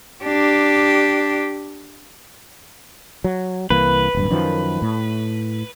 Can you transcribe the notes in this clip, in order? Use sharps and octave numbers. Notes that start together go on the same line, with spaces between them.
D4 G4
F#3
C2 E3 A#3 B4
D1 G2
F#2 D#3 F3
A2